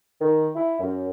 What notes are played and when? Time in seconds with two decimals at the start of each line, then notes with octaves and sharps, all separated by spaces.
0.21 D#3
0.56 E4
0.80 F#2